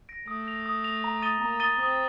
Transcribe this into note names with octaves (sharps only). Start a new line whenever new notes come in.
A#6 D7
A3 D#6
A#6 F7
D#6
A#6 F7
A#5
D#6 A6 D#7 G7
A#3 A#5
D#6 A6 D#7 G7
C4 D#6